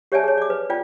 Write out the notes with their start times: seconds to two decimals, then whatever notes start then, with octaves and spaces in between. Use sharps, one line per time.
0.12 G4 C#5 D5 E5 G#5 A5
0.24 G#4 C#5
0.38 D5 D6
0.50 B4
0.70 F4 D5 G5